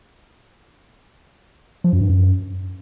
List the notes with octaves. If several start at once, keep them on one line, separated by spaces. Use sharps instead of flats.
F3
F#2
G2
F#2